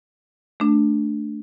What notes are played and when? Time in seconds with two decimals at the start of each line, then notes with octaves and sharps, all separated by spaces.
0.60 A3 D4